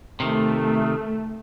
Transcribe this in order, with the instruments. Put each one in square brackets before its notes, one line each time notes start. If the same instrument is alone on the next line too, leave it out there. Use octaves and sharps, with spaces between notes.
[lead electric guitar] C3 D#3 [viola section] A3